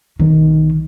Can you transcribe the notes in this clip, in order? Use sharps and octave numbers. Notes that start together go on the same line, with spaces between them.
B1 D#3